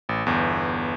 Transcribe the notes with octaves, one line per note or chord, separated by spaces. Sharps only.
A1
G1 E2